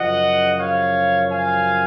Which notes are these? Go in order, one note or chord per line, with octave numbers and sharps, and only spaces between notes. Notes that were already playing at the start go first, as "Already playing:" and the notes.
Already playing: F#2 C#3 F3 D#5 F#5
C#5 F5
F5 G#5